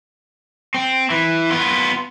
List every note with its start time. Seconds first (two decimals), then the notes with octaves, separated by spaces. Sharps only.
0.74 C4
1.10 E3
1.51 B3 F4